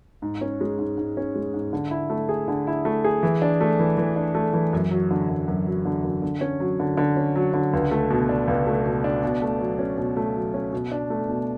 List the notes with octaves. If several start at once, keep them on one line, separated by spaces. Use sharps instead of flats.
G#2
C#4
G#3
G#2
G#2
C#4
G#3
G#2
D3
E4
A3
G#4
D3
E4
A3
G#4
E3
D4
A3
E3
E3
D4
A3
E3
F#2
F#3
D3
F#2
F#2
F#3
D3
F#2
D3
C#4
F#3
D3
D3
C#4
F#3
D3
C#2
A3
B2
D4
C#2
A3
B2
D4
B2
A3
F#3
C#4
B2
A3
F#3
C#4
B2
D4
A3
B2